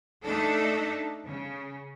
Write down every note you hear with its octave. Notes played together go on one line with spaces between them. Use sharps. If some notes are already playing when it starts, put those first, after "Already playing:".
A3 D4 D#4 A4
C#3